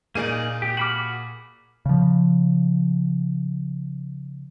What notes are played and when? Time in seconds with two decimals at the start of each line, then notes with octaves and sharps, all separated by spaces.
0.15 A#2 A#3 D#4 G#4 D5 D#7
0.62 G4
0.77 F#4 B5 D6 F6 F#7
1.86 C#3 F3